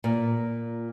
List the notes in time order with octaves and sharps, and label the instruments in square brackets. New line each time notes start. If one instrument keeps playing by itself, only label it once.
[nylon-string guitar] A#2